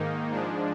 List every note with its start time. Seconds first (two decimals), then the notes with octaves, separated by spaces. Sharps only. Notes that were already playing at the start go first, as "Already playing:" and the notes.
Already playing: G#2 D#3 A#3 D#4
0.31 G#2 F3 G#3 D4